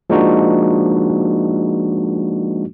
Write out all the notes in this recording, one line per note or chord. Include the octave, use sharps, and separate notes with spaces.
F3 G#3 A#3 D4 D#4 F#4